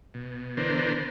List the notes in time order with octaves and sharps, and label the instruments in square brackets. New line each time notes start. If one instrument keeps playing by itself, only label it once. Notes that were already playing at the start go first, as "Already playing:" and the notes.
[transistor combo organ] B2
D3 E3 B3 D4 A#4 C5